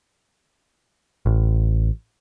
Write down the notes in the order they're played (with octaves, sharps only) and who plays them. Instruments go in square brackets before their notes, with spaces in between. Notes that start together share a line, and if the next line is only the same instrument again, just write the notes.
[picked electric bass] A1